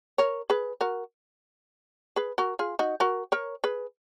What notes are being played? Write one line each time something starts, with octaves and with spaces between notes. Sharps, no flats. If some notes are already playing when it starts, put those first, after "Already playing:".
A#4 C#5
G#4 B4
F#4 A#4
G#4 B4
F#4 A#4
F4 G#4
D#4 F#4
F#4 A#4
A#4 C#5
G#4 B4